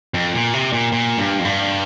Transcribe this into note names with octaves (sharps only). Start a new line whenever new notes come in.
F2
A#2
C3
A#2
A#2
G2
F2
G2